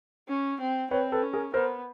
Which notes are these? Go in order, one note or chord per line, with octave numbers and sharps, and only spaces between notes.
C#4
C4
C4 B4 C#5
A4 B4
C#4
G#4 A#4
B3 A#4 C5